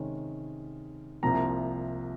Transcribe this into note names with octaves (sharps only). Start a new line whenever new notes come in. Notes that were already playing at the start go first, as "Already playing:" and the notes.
Already playing: C3 D#3 G#3 C#4
C2 C3 F3 A#3 A#5